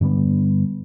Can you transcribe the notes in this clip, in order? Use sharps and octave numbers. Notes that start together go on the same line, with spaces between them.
G2 D3 G3 B3